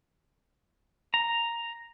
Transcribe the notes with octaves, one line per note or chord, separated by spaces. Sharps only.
A#5